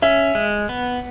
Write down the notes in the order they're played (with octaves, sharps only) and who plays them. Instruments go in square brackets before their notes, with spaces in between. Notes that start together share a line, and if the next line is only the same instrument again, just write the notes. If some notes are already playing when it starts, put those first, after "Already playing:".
[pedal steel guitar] C#4 [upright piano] E5
[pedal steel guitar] G#3
B3